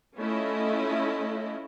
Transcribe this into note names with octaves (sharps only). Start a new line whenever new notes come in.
A3 C#4 E4 F4 D#5